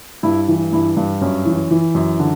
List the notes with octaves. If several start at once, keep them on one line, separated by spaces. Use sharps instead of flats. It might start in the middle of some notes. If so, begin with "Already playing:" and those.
G2 E4
E3
G2 E4
G2
F#2 C#4
E3
E3
F#2
D3